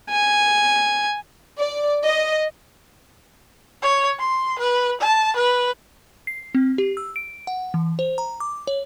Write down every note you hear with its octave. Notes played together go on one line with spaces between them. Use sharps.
G#5
D5
D#5
C#5
C6
B4
A5
B4
C7
C4
G4
E6
D7
F#5
E3
C5
A#5
D6
C#5